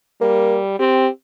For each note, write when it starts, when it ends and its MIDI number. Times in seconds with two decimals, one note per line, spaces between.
0.21 0.77 55
0.21 0.58 58
0.79 1.07 60
0.79 1.09 67